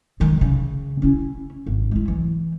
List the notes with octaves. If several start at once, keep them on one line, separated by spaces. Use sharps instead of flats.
D#3 G#3
C#3
C#4 E4
G#1
G#3 E4
E3